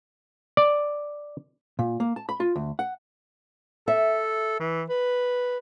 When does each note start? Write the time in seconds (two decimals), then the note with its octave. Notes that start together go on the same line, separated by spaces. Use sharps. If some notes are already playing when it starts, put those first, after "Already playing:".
0.57 D5
1.79 A#2
2.00 A#3
2.16 A5
2.29 B5
2.40 F4
2.56 D2
2.79 F#5
3.88 A4 E5
4.60 E3
4.89 B4